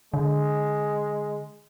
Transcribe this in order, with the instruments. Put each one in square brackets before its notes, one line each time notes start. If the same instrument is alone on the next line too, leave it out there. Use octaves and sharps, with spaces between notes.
[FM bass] D3 [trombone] G#3